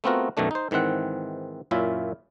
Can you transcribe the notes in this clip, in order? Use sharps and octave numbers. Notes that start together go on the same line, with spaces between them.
A3 B3 C4 F4 F#4 A#4
F#2 B2 D#3 A3 D4
D#4 C5
G#2 D#3 E3 C4 F#5
F#2 A#2 C#4 E4 F4 E5